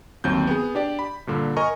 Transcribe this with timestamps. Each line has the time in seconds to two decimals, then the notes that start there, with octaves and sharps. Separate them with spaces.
0.24 G1 D#2 F#3 C4 G6
0.47 B3 G#4
0.75 D4 G4 D5
0.99 B5
1.27 G2 A#2 D3
1.57 A#4 D#5 G#5 A#5 C#6